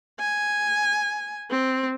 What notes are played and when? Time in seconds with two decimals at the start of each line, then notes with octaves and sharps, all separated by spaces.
0.20 G#5
1.50 C4